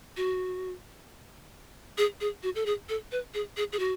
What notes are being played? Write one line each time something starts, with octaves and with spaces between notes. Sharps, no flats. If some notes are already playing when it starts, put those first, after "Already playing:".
F#4
G#4
G#4
F#4
A4
G#4
A4
B4
G#4
G#4
G#4
F#4